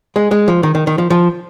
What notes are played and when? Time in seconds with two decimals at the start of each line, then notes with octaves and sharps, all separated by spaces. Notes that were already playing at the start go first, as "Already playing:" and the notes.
0.16 G#3
0.31 G#3
0.48 F3
0.63 D#3
0.75 D#3
0.87 D#3
0.98 F3
1.10 F3